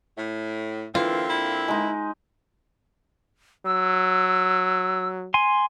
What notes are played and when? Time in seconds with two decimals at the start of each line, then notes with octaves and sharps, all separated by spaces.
0.18 A2
0.95 D3 E3 A#3 C4 F4
1.30 E4
1.68 G#3 D#4
3.65 F#3 E6
5.34 G#5 C6